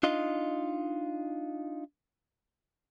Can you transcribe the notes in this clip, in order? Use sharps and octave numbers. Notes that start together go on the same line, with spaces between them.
D4 D#4 F4 D#5